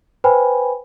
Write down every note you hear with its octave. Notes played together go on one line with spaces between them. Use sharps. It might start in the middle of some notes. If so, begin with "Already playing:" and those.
B4 C5 G5 G#5 B5